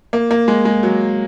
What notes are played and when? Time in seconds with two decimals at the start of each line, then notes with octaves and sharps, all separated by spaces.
0.13 A#3
0.31 A#3
0.48 G#3
0.65 G#3
0.83 F#3